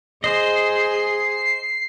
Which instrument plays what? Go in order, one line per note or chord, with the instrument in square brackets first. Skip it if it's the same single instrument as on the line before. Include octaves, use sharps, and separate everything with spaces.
[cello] G#4 [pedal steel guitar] C5 D#5 [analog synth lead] C7